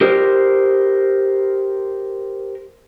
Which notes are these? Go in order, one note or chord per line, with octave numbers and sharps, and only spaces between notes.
G4 A#4 C5